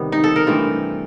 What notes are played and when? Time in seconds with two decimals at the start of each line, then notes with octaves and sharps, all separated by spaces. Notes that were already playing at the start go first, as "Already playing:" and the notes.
Already playing: C3 D#3 G3 B3
0.12 D#4
0.24 A4
0.36 A#4
0.46 G2 E3 A3 C4